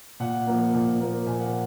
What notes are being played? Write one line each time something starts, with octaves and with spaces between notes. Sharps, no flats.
A#2 F#5
F3 A#3
A#2
F3 A#3
A#2 G#5
F#5